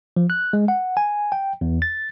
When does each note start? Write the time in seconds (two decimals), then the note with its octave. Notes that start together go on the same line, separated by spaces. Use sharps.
0.16 F3
0.30 F#6
0.53 G#3
0.68 F#5
0.97 G#5
1.32 G5
1.61 E2
1.82 A6